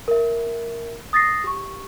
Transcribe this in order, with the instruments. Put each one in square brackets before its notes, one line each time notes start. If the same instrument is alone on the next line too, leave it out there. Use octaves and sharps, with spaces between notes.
[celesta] A#4 E5
D#6 A6 A#6 C7
G4 C#6